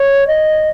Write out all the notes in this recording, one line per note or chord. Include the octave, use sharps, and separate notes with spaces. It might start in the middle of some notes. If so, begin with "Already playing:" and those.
Already playing: C#5
D#5